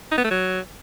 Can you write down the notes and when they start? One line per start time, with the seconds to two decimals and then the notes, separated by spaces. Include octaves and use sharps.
0.11 D#4
0.18 B3
0.24 A3
0.31 F#3